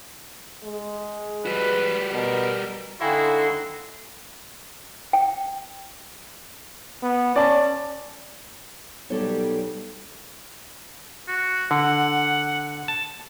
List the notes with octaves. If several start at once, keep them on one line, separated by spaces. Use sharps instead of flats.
G#3
G3 F#4 B4
B2 A#4
D3 D#4 E4 F#4 F5 G5 G#5 C6
G5
B3
C#4 D5 A5
B1 G3 G4 A4 C#5
F#4
D3 F#5
A5